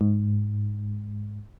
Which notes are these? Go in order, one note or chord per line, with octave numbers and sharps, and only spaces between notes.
G#2